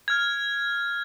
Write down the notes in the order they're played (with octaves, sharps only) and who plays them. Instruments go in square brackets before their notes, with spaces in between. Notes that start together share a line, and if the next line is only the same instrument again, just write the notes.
[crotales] F6 G#6